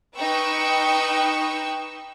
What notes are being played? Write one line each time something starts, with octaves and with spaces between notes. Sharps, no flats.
D#4 B4 G5 C#6 E6